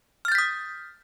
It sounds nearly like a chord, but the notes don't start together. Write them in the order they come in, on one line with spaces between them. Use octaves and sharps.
F6 A6 G6 B6 D#6